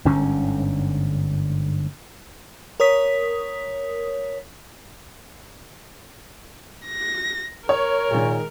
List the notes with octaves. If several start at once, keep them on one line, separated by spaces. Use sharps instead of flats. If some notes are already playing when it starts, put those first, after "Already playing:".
G1 G#2 D3 C#4
A#4 C#5 D#6 B6
A#6
A#4 C#5
A#2 D#3 G#3